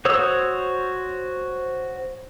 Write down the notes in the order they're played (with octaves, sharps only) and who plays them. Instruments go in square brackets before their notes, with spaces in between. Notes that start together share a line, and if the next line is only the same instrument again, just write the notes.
[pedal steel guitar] F#4 C5 C#5 D#6 E6